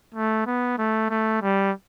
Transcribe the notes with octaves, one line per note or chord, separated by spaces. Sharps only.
A3
B3
A3
A3
G3